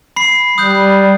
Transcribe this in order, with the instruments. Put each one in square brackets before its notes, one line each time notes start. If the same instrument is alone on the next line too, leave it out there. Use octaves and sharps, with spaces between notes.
[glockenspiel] B5 C7
[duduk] G3 [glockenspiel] D#6 F#6 G6